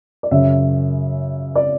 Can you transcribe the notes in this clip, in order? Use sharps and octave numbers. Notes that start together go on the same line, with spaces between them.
D5
F#2 C#3 F#3 E5
D5